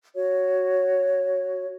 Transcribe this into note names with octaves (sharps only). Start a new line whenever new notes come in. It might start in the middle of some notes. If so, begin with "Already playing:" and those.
F#4 C#5